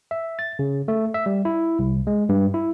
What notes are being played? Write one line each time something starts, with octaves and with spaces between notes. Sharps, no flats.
E5
A6
C#3
A3
E5
G3
E4
C2
G#3
G2
E4